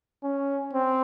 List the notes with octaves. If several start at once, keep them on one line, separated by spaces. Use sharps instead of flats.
C#4
C4